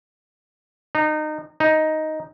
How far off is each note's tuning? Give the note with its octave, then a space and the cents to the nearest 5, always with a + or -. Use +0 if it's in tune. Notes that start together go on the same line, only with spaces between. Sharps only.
D#4 -25
D#4 +5